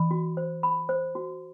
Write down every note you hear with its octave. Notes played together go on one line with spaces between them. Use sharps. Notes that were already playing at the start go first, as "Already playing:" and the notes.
Already playing: E3 B5
F#4
C5
B5
C5
F#4